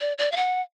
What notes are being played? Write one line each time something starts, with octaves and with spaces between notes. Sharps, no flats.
D5
D5
F5
F#5